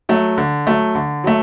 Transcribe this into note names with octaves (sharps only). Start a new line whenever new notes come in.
F#3 A3
D3
F#3 A3
D3
F#3 A3